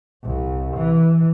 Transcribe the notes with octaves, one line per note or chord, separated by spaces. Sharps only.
C2
E3